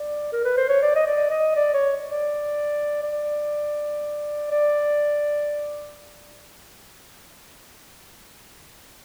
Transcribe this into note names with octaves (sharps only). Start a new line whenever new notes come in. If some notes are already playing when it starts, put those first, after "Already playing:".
Already playing: D5
A#4
B4
C5
C#5
D5
D#5
D5
D#5
D5
C#5
D5
D5
D5